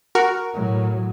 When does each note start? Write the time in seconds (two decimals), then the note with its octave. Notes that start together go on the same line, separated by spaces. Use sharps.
0.15 F#4 A#4
0.54 A2 F#3